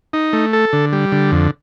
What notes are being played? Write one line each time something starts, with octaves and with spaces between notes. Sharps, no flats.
D#4
A3
A4
D3
G3
D3
F2